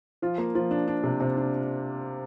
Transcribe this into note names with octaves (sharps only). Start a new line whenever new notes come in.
F3 F4
A#3
F3 F4
D4
D4
C3
C3
D4